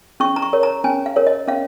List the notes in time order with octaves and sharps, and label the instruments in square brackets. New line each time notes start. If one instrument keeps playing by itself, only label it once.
[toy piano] C#4 C#6
A#5
C#6
A#4 C#5
A#5
C#4 G#5
F5
A#4 C#5
D#5
C#4 F5